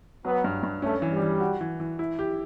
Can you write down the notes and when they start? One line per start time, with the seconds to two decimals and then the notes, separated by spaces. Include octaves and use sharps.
0.25 F#3 B3
0.44 G2
0.63 G2
0.82 A3 C#4
1.02 E3
1.12 G3
1.22 E3
1.40 F#4
1.61 E3
1.80 E3
1.99 E4
2.19 G4